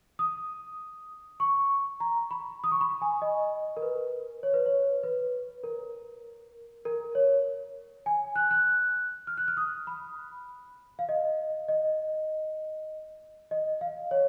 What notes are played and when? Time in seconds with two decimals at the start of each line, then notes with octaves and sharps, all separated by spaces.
0.19 D#6
1.40 C#6
2.00 A#5
2.31 B5
2.64 D#6
2.72 C#6
2.81 B5
3.02 G#5
3.22 D#5
3.77 A#4
3.82 B4
4.43 C#5
4.54 B4
4.66 C#5
5.03 B4
5.63 A#4
6.85 A#4
7.15 C#5
8.06 G#5
8.36 F#6
8.51 F#6
9.27 F6
9.37 F#6
9.48 F6
9.57 D#6
9.87 B5
10.99 F5
11.09 D#5
11.68 D#5
13.51 D#5
13.81 F5
14.11 C#5